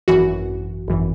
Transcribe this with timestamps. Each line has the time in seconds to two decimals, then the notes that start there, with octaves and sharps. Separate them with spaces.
0.08 G#1 F#2 E3 F#4
0.88 G#1 F#2 E3